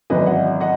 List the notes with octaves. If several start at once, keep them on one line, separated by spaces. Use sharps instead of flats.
G#1 F#2 E3 B4 D#5
D#5 F#5
D#5 F#5